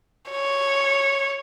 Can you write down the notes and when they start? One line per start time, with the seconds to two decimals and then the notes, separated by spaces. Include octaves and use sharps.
0.30 C#5